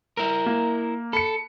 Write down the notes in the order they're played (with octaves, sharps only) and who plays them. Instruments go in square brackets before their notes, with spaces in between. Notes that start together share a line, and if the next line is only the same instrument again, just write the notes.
[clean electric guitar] E4 A#4
[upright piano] A#3
[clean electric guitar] A4 [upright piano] B5 C#7